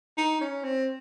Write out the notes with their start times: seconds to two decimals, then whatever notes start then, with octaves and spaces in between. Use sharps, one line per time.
0.18 D#4
0.41 C#4
0.64 C4